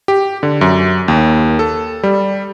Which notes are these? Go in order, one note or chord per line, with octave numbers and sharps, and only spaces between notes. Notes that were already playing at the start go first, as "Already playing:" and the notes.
G4
D3
F#2
D#2
A4
G3